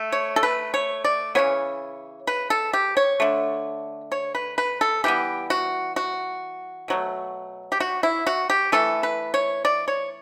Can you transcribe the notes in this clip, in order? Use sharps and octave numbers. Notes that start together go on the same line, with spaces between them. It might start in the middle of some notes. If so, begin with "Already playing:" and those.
Already playing: A3
C#5
A4
B4
C#5
D5
C#3 E3 B3 C#5
B4
A4
G4
C#5
D3 A3
C#5
B4
B4
A4
E3 G3 B3 G4
F#4
F#4
B2 F#3 A3
G4
F#4
E4
F#4
G4
E3 A3 A4
B4
C#5
D5
C#5